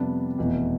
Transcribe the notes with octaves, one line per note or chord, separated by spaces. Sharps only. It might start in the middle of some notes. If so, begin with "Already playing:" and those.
Already playing: F2 C3 G3 B3 D4
F1 E2 B2